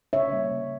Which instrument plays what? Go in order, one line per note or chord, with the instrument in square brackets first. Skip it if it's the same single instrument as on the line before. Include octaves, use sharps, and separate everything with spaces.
[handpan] C#3 C#5 E5
G3 A#3
C#3